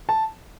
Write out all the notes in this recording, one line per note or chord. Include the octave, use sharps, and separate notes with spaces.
A5